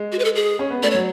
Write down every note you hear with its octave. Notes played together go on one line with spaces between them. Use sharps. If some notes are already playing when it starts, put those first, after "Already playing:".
Already playing: G#3
F#4
B4
A4
G#4
C#4
B3
A3 D5
C#5
F#3